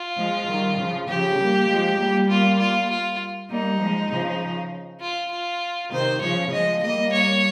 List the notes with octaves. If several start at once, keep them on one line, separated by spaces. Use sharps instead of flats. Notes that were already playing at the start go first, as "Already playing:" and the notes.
Already playing: F4
F3 G#3
D#3 G3
C#3 F3
C#3 F3 G4
G3 A#3
F3 G#3
G3 A#3
F4
F4
F4
G3 A#3 D#4
F3 G#3
C#3 F3
F4
F4
C3 D#3 C5
C#3 F3 C#5
F3 G#3 D#5
G3 A#3 D#5
C#5